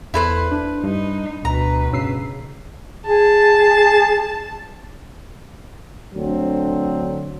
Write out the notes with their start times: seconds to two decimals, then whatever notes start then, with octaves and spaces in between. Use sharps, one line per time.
0.14 E2 E4 A4 B4 C5 B5
0.51 D4
0.83 G2 D#4
1.45 D2 B2 B4 A#5
1.93 G2 C#3 E6 C7
3.06 G#4 A5
6.15 D2 D3 F#3 C4